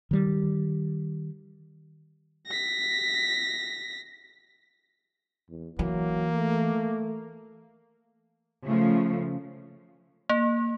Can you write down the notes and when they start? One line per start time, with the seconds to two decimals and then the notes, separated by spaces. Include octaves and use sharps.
0.11 D#3 G3
2.47 A#6 B6
5.49 E2
5.79 E3 F#3 A#3
6.33 A3
8.67 C#3 F3 A3
10.29 A#3